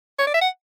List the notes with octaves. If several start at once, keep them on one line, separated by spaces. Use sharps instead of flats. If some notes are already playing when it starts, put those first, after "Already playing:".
C#5
D5
E5
F#5